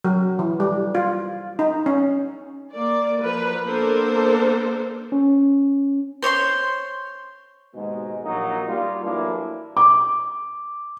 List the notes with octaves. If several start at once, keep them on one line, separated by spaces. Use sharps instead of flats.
F#3
E3
G3
F4
D#4
C#4
A#3 D5
F3 A#4 B4
A#3 B3 D4 A4 A#4 C5
C#4
C5 C#5 D#5 C6
D#2 G#2 B2 G#3
A#1 D#2 A#2 F#3 A#3 D#4
G3 A#3 F4
A2 E3 F#3 A#3 D4 E4
D6